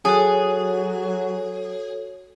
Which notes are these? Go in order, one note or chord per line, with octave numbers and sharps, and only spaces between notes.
F#3 F#4 G#4 A4 C#5